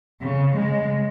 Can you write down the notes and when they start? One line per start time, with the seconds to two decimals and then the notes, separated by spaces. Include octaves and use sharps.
0.21 C#3
0.56 G#3